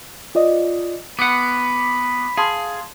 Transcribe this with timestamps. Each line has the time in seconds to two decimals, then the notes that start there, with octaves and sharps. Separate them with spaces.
0.35 F4 D5 D#5
1.19 B3 F#5 B5 D6
2.37 G#4 F5 A5 C6